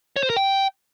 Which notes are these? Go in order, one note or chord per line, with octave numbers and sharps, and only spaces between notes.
C#5
C5
A#4
G5